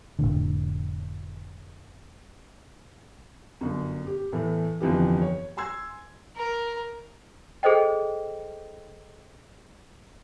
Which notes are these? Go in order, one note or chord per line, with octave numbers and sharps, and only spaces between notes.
F1 A#1 A2 D3
G1 F#2
G4
E2 A2 E3 A3
G1 F2 E3 G4
C#5
G#5 C6 E6 G#6
A#4
G#4 A4 C5 D#5 G5